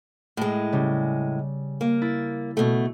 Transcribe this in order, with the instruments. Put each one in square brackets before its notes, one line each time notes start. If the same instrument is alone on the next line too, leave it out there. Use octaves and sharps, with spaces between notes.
[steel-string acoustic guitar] A2 G#3
[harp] C#3 G3
[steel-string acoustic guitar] A#3
[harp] E4 A6
[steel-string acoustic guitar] B2 A3